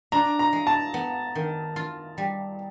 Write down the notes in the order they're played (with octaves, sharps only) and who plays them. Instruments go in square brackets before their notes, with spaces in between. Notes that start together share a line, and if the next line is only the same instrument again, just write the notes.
[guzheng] D4 [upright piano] A#5
[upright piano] A#5
[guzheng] G#3
[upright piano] A5
[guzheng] B3
D#3
F4
G3